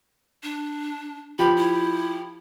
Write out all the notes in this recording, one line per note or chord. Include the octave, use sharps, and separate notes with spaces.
D4
F3 G4 B5
E4